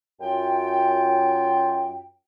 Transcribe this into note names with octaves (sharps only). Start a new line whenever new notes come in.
F#2 F4 G5